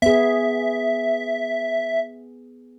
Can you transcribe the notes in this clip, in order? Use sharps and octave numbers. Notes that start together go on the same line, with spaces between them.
B3 G#4 E5